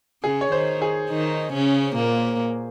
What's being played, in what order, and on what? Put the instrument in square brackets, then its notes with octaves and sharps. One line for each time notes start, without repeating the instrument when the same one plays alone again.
[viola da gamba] C#3 C#4 [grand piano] G#4
[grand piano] C#5
[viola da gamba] D#3 D#4 [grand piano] C5
[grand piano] G#4
[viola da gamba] D#3 D#4
C#3 C#4
A#2 A#3